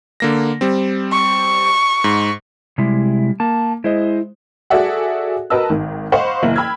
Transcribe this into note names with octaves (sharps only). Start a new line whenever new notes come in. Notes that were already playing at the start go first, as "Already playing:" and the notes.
D3 A#3 A#6
G3 C4
C#6
G#2
C3 G3 G#3 E4
A#3 A5
G#3 E4 C5 D#5
F#4 G#4 A4 D5 E5 F#5
F#4 A#4 B4 D#5 A5 E6
G#1 D#3
C5 D#5 F5 F#5 B5 C#6
F#1 E3 A#3 E4 F#7
G5 B5 E6 F6 G#6